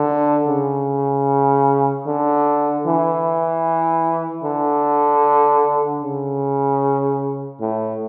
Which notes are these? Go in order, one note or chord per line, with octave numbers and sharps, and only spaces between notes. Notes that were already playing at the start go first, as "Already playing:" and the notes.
Already playing: D3
C#3
D3
E3
D3
C#3
A2